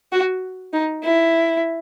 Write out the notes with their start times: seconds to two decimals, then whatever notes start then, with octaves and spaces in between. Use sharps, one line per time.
0.12 F#4
0.73 D#4
1.04 E4